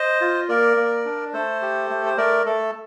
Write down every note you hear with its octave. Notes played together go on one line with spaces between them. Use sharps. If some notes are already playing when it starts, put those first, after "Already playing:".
Already playing: C5 D#5
F4
A#3 A#4 D5
A#3
D4
A3 A4 C5
G4
A3
C5
A3 A#4 D5
A3 A4